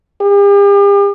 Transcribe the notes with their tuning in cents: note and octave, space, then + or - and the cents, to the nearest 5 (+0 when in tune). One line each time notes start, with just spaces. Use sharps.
G4 +45